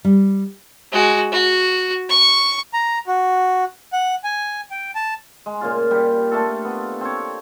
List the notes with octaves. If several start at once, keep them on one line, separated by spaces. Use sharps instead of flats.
G3
G#3 F#4
F#4
C#6
A#5
F#4
F#5
G#5
G5
A5
G#3
A#2 C#3 F4
G3 G4
A3 D4 F4 A4
B3
C4 C#5